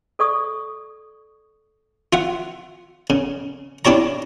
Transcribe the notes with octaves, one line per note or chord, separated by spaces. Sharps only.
A4 D5 C#6 D#6
F4 E5 F#5
C#3
D4 E4 G4 C#5 A#5